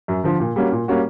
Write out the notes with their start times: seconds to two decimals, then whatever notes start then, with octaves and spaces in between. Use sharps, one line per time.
0.08 F#2
0.24 D3 F3
0.40 A#2
0.56 G3 A#3 C#4 F#4
0.72 A#2
0.88 G3 A#3 C#4 F#4